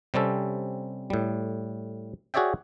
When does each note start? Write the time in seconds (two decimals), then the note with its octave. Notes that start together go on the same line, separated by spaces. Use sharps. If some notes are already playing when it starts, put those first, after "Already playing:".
0.14 C3 G3 C4 C#4 A4
1.10 A2 G3
2.34 F#4 G#4 C#5 D5 E5 G5